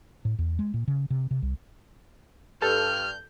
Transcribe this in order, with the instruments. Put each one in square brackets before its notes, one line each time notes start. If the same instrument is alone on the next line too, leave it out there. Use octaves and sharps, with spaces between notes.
[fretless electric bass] A2
E2
G#3
A#2
C#3
C3
C3
C2
[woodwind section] G2 [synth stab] A4 [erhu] F6 [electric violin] G6